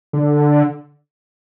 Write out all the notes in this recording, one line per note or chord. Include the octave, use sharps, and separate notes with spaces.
D3